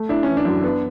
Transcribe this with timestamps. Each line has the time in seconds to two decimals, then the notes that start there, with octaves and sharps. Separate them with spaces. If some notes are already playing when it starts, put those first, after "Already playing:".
Already playing: A3
0.09 D4 E4
0.23 E3 C#4
0.37 D4
0.45 F#2
0.64 B3